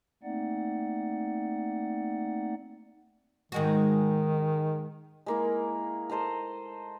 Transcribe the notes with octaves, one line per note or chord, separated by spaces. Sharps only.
A3 A#3 C4 D#4 D5 F#5
G#2 D#3 G#3 F#4
G#3 A#3 E4
A4 C5 D#5 A#5